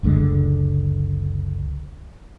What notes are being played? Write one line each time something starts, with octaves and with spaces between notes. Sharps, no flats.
F#1 C#2 D3 G#3